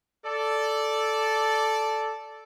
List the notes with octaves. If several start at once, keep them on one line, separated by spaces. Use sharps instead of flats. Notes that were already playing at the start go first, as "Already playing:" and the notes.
A4 D5